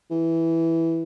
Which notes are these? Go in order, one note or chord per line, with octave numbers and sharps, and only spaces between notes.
E3